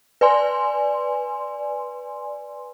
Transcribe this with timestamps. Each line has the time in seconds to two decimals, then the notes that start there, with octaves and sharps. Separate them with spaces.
0.21 B4 D5 G#5 C6